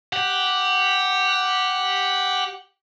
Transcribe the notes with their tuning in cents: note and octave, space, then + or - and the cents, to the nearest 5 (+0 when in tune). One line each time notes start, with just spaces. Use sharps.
G4 +0 F#5 +0